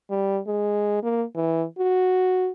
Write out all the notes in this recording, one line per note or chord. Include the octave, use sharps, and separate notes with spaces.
G3
G#3
A#3
E3
F#4